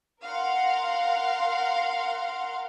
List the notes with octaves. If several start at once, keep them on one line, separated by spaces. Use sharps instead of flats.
A#4 F5 F#5 C6